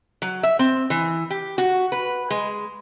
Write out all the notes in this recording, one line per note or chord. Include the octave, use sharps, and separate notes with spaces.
F#3
E5
C4
E3
G4
F#4
B4
G#3